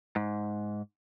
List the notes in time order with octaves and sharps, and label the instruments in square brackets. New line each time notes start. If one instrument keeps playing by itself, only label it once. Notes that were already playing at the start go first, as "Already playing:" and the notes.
[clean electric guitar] G#2